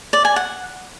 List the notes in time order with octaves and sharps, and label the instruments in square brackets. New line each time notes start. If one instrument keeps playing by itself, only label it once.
[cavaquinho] D5
G#5
F#5